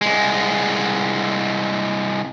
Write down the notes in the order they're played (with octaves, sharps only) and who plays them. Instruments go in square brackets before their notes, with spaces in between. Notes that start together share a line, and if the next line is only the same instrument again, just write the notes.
[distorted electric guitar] C2 G#3